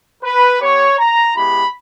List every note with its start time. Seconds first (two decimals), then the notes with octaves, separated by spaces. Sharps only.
0.23 B4
0.61 B3 G4 C#5
0.99 A#5
1.37 G#3 B3 E4 G4 B5